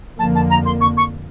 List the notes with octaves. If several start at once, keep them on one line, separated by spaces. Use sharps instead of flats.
F2 D3 F3 A#3 A5
A5
A#5
C6
C#6
C#6